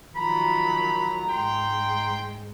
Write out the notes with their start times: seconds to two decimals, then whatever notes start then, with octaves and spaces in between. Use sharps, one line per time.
0.16 D#3 F3 F#3 A#5 B5
1.30 G#2 G#3 G5 C6